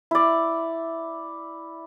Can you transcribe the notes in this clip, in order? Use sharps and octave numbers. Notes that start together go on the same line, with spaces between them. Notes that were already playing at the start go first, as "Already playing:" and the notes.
E4 D5